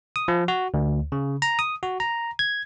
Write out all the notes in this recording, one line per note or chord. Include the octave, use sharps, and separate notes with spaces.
D#6
F3
F#4
D2
C#3
A#5
D#6
F#4
A#5
G#6